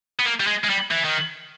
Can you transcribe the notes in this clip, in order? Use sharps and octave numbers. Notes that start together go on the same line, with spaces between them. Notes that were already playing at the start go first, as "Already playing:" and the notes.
B3
A#3
G3
G#3
G#3
G3
E3
D#3